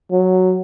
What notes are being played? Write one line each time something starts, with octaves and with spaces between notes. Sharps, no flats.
F#3